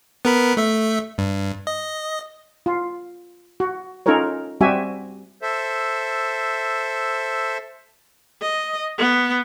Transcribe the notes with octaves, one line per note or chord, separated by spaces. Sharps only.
B3 A#4 B5
A3 E5
G2
D#5
F4
F#4
C#4 D#4 F4 A4 A#4 C#5
G3 C4 F#4 G4 E5 G#5
A4 C5 E5
D#5
B3